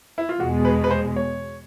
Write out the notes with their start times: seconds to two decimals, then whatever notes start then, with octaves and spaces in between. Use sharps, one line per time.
0.18 E4
0.29 F4
0.40 E2 B2 G#3 F#4
0.65 B4
0.84 B4
0.91 C5
1.16 C#5